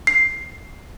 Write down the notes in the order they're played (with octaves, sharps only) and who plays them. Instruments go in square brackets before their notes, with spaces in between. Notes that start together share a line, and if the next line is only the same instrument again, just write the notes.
[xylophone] C7